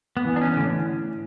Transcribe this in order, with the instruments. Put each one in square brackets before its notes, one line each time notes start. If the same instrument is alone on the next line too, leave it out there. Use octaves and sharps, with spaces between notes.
[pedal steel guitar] B3
[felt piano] E3
[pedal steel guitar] D4
C#4
[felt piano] A2 [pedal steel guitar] D3